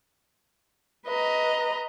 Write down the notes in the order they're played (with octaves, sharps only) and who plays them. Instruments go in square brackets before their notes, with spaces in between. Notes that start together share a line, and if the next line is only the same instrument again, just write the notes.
[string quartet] B4 D#5 A#5